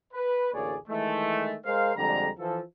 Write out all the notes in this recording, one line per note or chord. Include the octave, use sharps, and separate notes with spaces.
B4
A1 D2 A#3 G#4 C#5 D5
D#3 E3 G#3 A3
G#3 A#4 C5 F5
F2 D3 G3 G#3 A#5
E3 F3 A4